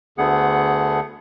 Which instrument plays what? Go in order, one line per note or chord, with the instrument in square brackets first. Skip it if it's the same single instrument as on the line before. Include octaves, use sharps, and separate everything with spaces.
[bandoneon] D2 D3 A3 B3 G#4 F#5